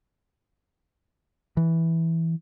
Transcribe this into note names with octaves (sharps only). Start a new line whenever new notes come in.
E3